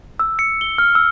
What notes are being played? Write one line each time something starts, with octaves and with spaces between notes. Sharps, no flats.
E6
C#7
G7
F6
E6